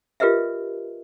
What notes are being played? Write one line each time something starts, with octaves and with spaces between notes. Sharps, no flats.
F4 G4 A#4 B4 D#5 E5